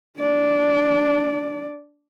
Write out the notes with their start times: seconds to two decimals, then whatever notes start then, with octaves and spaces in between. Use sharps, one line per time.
0.18 D4 D5